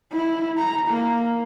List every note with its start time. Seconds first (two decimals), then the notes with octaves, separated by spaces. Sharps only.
0.13 E4
0.57 A#5
0.87 A#3